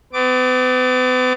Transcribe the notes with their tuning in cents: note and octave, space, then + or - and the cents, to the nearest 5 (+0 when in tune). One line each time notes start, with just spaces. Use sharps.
B3 +45 D6 +0